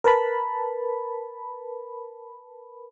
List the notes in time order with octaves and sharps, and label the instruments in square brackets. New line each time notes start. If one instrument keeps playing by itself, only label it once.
[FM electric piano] A#4 B4 A5 B5